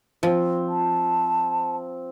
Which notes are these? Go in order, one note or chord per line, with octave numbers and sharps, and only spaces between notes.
F3 C4 F4
A5